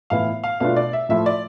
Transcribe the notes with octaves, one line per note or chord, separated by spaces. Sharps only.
A2 E3 B3 E4 F5
F5
B2 A3 D4 F4 F5
D5
E5
A2 F3 A3 E4 E5
D5